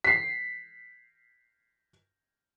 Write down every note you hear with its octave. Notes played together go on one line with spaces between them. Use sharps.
B6 C7